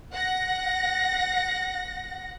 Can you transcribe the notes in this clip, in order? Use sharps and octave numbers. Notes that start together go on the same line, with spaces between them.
F#5 A#6